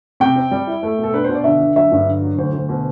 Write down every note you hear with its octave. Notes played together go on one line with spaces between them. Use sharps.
C3 G5
C4
G3
E4
A3
B2
A4
D4 B4
B2 C5
D5
D3 E5
D3
F#3 E5
G2
D3
F#3
D2 C5
D2
B2